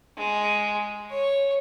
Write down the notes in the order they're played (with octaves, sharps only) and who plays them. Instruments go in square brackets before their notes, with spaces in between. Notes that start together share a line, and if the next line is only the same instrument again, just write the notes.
[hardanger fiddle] G#3
C#5